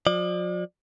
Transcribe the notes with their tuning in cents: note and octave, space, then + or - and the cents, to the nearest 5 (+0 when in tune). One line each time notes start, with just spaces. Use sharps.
F3 +45 D5 +30